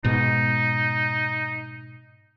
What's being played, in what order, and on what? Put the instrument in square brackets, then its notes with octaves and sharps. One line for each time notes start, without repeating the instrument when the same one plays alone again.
[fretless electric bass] G#2 B2 [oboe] D#4